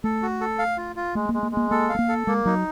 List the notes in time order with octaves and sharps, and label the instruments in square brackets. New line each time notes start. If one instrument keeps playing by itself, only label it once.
[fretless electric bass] A3 [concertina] A4
[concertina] F#4
A4
F5
F4
F4
[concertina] G#3 [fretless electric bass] A3
[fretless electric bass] A#3
[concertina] G#3
[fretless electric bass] A#3
[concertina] G#3
[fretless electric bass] A#3
[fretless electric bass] A#3 [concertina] A4
[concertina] F5
[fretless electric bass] A3
A#3
[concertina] A4
[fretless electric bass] G#3 [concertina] A#3
[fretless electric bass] F#3 [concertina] D#4